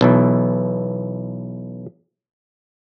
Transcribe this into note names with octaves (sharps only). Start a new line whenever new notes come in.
B1 B2 E3